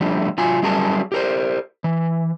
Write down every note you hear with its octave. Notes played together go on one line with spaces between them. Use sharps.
F3 G3 A3 D4
F#3 F4 G#5
F#3 G3 C#4 G#4 A#4 A5
G4 A#4 C5
E3